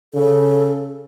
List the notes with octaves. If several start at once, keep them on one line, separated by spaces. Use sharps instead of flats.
C#3 A4